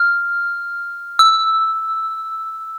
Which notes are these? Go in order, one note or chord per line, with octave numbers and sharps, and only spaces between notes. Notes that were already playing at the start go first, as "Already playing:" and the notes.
Already playing: F6
E6